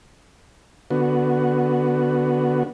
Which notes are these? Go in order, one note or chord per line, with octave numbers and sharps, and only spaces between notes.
D3 B3 F#4